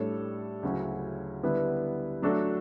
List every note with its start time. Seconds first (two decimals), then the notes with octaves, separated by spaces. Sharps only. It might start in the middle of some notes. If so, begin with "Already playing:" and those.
Already playing: A2 G3 D4 A4 C#5
0.63 D2 C#3 F#3 C#4 E4
1.43 D3 G3 B3 E4 B4
2.22 F#3 A3 D4 F#4 A4